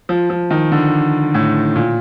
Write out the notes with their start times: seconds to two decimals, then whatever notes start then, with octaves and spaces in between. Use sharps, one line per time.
0.09 F3
0.30 F3
0.51 D#3
0.72 D3
1.34 A2
1.76 A#2